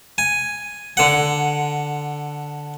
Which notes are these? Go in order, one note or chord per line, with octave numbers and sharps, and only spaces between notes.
G#5
D3 F#5